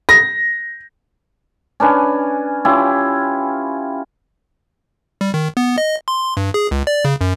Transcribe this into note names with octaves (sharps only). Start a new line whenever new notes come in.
A#6
C#4 D4 B4 G#5
C#4 E4 F4 G4
G3
D#3
B3
D#5
C6
G2
G#4
C#2
D5
C#3
F#2